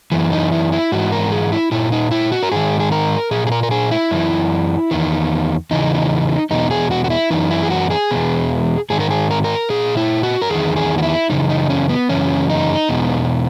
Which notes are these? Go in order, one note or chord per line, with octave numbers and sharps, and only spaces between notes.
F#2 E3
D#4
E4
E4
G#2 E3 F#4
A#4
G#4
E4
A#2 E4
D#4
E4
F#4
A#4
G#2 D#3 G#4
G#4
A#4
A#2 G#4
G#4
A#4
A#4
G#4
E4
F#2 E3
E2 D#3
E2 C#3 E3 D#4
E2 B2 D#4
G#4
F#4
F#4
E4
F#2 E3 D#4
E4
G#4
F#4
G#4
E2 B2
G#2 D#3 G#4
A#4
G#4
A#4
A#4
A#2 G#4
E4
F#4
A#4
E2 D#3 G#4
G#4
F#4
E4
F#2 C#3 E3 D#4
D#4
C#4
B3
F#2 C#3 E3 C#4
D#4
E2 B2